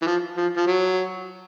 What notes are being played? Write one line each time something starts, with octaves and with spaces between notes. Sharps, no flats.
E3
F3
F3
F3
F#3